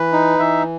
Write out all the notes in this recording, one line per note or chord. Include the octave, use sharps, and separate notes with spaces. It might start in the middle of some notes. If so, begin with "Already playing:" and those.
Already playing: E3 B4
D#4
E3 E5